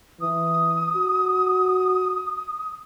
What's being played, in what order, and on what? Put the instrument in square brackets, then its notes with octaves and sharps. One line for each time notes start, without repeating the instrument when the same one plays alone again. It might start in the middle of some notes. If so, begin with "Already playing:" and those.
[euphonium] E3 [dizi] D#6
[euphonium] F#4